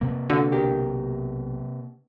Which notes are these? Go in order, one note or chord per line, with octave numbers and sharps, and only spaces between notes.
C3 A#3
D3 F#4 F5
B1 G4 A#4